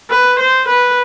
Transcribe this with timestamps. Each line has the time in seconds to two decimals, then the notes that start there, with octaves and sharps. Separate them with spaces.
0.10 B4
0.39 C5
0.68 B4